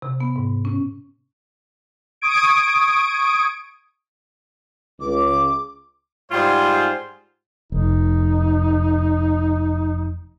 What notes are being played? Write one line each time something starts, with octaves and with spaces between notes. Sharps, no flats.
C3
B3
G#2
C#4
C#6 D#6 G#6 D7
C#2 D6
G#2 G3 F4 G#4 C5
F1 D#4